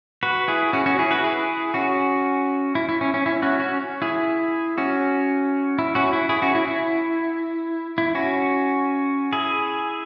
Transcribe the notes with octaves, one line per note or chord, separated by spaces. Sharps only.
F#4 B4
E4 G#4
C#4 F#4
C#4 F#4
E4 G#4
F#4 B4
E4 G#4
C#4 F#4
E4
E4
C#4
C#4
E4
C#4 F#4
C#4 F#4
E4 G#4
C#4 F#4
E4
C#4 F#4
E4
E4 G#4
C#4 F#4
E4
E4
E4
C#4 F#4
E4 G#4